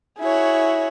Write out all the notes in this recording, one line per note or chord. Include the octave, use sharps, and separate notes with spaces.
E4 F#4 G#4 C#5